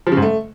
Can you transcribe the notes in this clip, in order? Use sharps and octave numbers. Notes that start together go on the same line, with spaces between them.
F3
C#3
G#2
A3